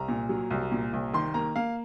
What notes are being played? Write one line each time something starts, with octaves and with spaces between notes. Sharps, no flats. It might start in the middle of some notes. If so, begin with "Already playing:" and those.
Already playing: C2 A#5
A#2
F#3
C2
A#2
C2
D#3 C6
A#3 A#5
A#3 F5